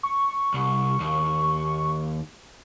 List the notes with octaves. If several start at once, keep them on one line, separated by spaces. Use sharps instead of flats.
C#6
C2
D#2